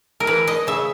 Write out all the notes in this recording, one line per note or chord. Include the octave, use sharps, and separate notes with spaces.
A#4
E3 B4
D#5
C#3 E5